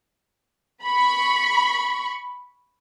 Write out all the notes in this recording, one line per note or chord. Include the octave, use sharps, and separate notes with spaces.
B5 C#6